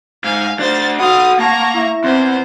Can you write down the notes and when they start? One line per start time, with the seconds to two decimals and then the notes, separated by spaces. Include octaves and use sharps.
0.24 G#2 F5 G#5
0.59 D4 F#4 C5 A6
1.00 F#4 F5 F#5 B5 C6 D#6
1.39 A#3 F#5 A5 A#5 C#6
1.74 E4 E5
2.04 E2 C4 C5